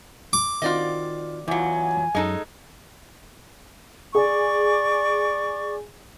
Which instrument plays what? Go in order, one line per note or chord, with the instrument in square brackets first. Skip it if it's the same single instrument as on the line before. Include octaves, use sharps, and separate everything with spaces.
[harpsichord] D6
[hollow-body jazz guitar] D#3 C4 F#4 [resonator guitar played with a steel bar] F4 D5 D#5
[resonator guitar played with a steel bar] E2 F#3 [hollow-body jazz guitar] E3 F4 [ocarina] G#5
[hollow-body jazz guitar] F#2 [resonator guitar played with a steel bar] G#3 D#4 A4
[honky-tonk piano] G#4 [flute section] D5 C#6 D6